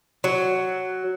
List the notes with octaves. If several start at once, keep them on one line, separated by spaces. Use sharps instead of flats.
F#3